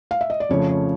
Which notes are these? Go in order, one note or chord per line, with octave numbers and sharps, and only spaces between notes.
F5
E5
D#5
D5
F2 C#3 F3 A3 C#5
C#5